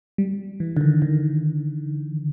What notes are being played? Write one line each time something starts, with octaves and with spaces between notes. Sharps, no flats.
G3
E3
D3
D#3
D#3